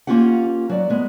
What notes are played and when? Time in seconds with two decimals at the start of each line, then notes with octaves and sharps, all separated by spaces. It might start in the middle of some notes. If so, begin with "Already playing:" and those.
0.07 A#3 C#4 F4 G4 F#5
0.69 F#3 D5
0.90 G#3 B3